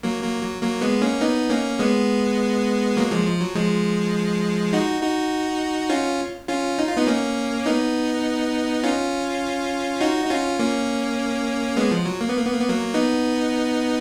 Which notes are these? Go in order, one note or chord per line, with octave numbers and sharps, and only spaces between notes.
F#3 A#3
F#3 A#3
F#3
F#3 A#3
G#3 B3
A#3 C#4
B3 D#4
A#3 C#4
G#3 B3
F#3 A#3
F3 G#3
F3
F#3
F3 G#3
D#4 F#4
D#4 F#4
C#4 F4
C#4 F4
D#4
F4
B3 D#4
A#3 C#4
B3 D#4
C#4 F4
D#4 F#4
D#4
C#4 F4
A#3 C#4
G#3 B3
F3
F#3
A#3
B3
A#3
B3
A#3
B3
F#3 A#3
B3 D#4